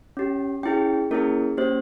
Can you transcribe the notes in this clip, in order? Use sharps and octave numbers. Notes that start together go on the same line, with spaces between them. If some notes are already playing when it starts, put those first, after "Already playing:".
C#4 G4
C#4 E4 G#4 G5
A#3 C#4 E4 G#4 A#4
A#3 C#4 G4 C5